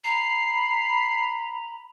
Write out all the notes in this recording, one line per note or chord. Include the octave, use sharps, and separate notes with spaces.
A#5 B5 C7